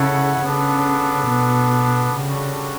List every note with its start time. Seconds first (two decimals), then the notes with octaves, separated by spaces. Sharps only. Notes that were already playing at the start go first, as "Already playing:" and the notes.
Already playing: C#3 E4 A4 C#5 F#5
0.43 C#3 B3 D4 A4
1.30 B2
2.16 C#3 G3 D4 F#4 A4 C#5